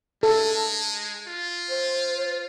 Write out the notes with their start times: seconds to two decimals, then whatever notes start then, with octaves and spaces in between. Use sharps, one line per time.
0.23 G#3 A4
1.28 F4
1.69 C5